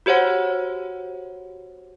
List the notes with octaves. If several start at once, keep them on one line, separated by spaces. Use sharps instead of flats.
F#4 G4 C5 C#5 F#5